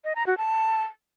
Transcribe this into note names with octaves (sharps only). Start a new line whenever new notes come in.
D#5
A#5
F#4
A5